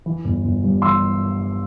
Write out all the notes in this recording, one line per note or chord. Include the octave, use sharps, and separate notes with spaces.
E3
G1
G1
G2
E3 C6 E6